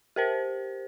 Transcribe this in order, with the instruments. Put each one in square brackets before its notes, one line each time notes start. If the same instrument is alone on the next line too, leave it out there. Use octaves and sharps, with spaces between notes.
[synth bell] G4 A#4 C5